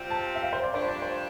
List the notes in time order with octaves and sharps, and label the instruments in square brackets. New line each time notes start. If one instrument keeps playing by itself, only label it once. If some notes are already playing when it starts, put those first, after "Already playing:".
Already playing: [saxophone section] C3 G3 C4 F4
[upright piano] A5
E5
F5
C5
D5
[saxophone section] G2 F3 A3 D4 [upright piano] C5
[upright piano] D5
C5